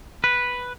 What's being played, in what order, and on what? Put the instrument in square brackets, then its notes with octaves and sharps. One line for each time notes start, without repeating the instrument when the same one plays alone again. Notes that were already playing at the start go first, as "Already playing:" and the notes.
[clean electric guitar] B4